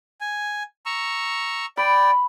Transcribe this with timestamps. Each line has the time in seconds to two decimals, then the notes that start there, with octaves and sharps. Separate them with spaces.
0.21 G#5
0.86 A#5 C#6 E6
1.77 D5 G5 B5